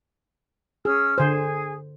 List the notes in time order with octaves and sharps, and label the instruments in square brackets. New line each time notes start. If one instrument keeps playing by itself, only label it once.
[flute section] C#4 E6 F6 [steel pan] G#4
[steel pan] D3 C5 [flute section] G#4 G#5